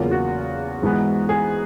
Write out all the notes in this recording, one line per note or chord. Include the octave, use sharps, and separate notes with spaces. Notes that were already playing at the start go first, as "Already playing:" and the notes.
Already playing: E2 C#3 F#3 A#3 F4
F#4
G#2 E3 G#3 B3
G#4